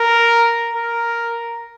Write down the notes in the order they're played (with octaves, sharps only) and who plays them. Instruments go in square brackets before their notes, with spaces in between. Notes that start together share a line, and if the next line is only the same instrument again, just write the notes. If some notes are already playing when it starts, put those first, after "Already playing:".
Already playing: [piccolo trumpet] A#4
A#4